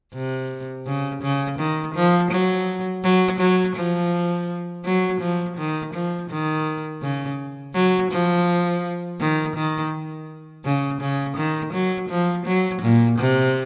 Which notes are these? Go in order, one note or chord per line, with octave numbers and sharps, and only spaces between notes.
C3
C#3
C#3
D#3
F3
F#3
F#3
F#3
F3
F#3
F3
D#3
F3
D#3
C#3
F#3
F3
D#3
D#3
C#3
C#3
D#3
F#3
F3
F#3
A#2
C3